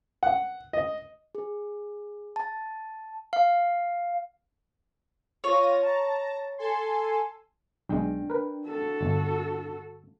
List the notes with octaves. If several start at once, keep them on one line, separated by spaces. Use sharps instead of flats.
F#5
D#5
G#4
A5
F5
F4 C#5 A#6 D#7
A5 A#5
A4 G#5 C6
B1 G#3 D4 G5
A#4 B4
F#4 A4
G1